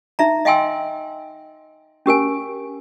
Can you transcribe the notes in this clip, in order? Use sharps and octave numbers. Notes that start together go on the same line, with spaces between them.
D#4 E5 A#5
D#5 F5 G5 G#5 C6 E6
C#4 G4 A#4 G#5